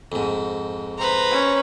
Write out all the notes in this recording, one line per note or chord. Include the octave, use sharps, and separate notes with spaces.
F2 G#2
B4 C5 A#5
C#4